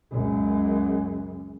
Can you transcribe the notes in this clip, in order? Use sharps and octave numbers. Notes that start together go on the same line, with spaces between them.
C#2 F#2